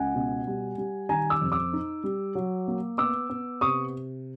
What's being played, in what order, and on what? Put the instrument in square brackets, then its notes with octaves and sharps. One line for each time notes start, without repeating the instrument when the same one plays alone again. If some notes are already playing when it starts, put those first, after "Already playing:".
Already playing: [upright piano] C#2 F#5 G#5
B2
G3
G3
D#3 G#5 A#5
D6 E6
F2
D6 E6
D#4
G3
F#3
A#3
B3 D6 E6
B3
C3 C#6 D#6